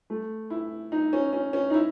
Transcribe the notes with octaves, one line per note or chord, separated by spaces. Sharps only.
A3
E4
D#4
C#4
C#4
C#4
D#4
E4